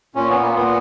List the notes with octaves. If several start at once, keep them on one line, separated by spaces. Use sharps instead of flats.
A#2 C#4
B3
A#3
A#2 B3